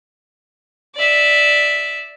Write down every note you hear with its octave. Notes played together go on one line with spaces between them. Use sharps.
D5 E5